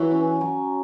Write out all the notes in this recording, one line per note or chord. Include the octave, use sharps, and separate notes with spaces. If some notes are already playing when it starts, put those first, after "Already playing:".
Already playing: E3 F#3 F#4
C#4
F#3